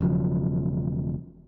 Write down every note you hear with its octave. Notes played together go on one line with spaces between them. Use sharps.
E1 C#3 F3 F#3